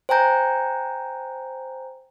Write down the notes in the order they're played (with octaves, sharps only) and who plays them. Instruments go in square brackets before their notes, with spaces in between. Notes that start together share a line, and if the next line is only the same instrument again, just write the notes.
[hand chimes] C5 G5 G#5 A#5 G6